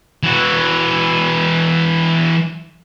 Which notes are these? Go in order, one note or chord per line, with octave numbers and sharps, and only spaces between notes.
E3 F#4